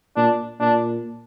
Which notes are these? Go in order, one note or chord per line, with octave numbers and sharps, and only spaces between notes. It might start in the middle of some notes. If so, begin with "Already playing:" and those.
A#2 D4
A#2 D4